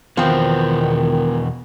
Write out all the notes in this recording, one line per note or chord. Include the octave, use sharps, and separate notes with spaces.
E2 B2 D#3 F3 B3 C4